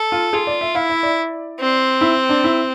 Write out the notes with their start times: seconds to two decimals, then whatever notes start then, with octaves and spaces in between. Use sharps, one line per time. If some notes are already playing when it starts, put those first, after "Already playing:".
Already playing: A4
0.12 F4
0.33 F4 G#4
0.47 D5
0.61 E5
0.75 E4 F5
0.90 E5
1.03 D5
1.60 C4
2.01 E4
2.29 D4
2.44 E4